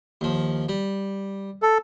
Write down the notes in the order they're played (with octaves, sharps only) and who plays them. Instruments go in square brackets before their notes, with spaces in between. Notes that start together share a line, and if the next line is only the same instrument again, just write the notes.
[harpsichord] D#2 F3
G3
[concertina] A4